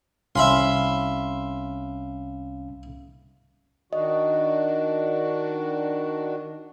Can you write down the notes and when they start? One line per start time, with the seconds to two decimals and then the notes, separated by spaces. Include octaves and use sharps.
0.35 C2 C#4 E5 F5 B5 C6
3.93 D#3 D4 F#4 D#5